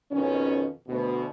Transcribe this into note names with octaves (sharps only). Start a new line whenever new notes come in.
F2 B2 D#3 C#4
D2 B2